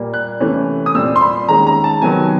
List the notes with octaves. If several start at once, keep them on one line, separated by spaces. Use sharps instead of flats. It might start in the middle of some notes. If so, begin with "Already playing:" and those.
Already playing: A#2 G3 A#3
F#6
C3 E3 A3 C#4
D#6
A#2 G3 C4 E6
C6
B5
D#3 G#3 C#4 A#5
A#5
A5
C3 D#3 F#3 B3 G#5